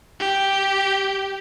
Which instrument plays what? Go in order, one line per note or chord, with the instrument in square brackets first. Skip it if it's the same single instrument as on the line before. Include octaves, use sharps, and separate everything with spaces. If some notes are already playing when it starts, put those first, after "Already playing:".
[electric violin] G4